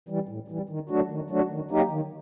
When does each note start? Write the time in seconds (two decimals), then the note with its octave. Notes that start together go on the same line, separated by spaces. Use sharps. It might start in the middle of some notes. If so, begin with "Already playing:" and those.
0.09 E3 G3
0.29 A2
0.48 E3 G3
0.69 D#3
0.90 F#3 A3 D4 F#4
1.10 D#3
1.30 F#3 A3 D4 F#4
1.50 D#3
1.71 F#3 A#3 D#4 G4
1.91 D#3